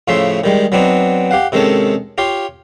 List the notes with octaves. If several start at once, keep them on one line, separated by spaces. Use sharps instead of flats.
A2 C#3 F3 C#4 E5 C6
D#3 G3 G#3
F#3 B3 C4 D4 D#4
G4 F5 F#5
C3 D#3 G#3 C#4 A4
F4 G4 C#5 F5